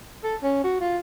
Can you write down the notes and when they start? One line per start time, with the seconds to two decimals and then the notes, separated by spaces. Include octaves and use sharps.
0.24 A4
0.43 C#4
0.64 F#4
0.81 F4